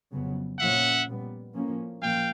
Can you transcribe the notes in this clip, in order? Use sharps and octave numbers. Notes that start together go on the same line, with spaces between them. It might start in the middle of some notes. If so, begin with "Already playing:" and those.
F2 C#3 F#3 B3
A#2 F3 A#3 C#4 E5 F#5
A#2 G3 B3
A2 F3 A#3 C#4
A#2 F3 A#3 F5 G5